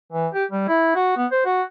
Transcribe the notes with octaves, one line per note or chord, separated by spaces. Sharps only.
E3
G4
G3
E4
F#4
B3
C5
F#4